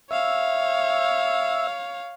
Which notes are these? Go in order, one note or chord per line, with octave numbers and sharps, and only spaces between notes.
C#5 E5 F5